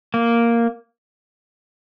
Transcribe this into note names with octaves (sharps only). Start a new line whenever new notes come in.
A#3